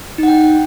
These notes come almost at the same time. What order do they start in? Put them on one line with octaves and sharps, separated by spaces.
D#4 F#5 G5